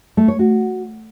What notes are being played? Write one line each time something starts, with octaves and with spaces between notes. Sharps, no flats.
A3
C#5
F#4